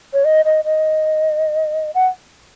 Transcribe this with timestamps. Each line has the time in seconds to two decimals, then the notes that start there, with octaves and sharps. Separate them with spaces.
0.13 C#5
0.25 D#5
0.45 D#5
0.65 D#5
1.94 F#5